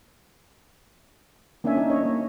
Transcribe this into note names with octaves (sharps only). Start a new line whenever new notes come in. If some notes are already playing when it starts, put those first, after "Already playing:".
A#3 C#4 D4 C#5 E5 G#5
D#4
C#5 D#5
A#3